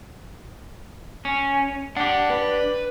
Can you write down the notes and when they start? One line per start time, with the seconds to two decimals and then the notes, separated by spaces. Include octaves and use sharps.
1.25 C#4
1.97 D4 G4 F#5
2.30 B4